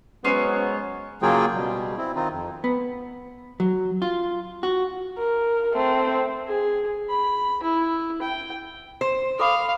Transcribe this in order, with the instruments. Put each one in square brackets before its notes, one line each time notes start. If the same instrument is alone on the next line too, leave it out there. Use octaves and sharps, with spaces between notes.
[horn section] F#3 G#3 B3 [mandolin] C#4 C5 C#5
[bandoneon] C#3 F#3 A#3 F4 G#4 G5
B2 G3
C4 E4
D#3 C4 D#4 F4
F2
[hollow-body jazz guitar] B3
F#3
F4
F#4
[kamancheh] A#4
A3 C4
[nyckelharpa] G#4
B5
E4
G5
[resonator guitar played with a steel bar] C5
[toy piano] A4 B5 D6 [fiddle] F5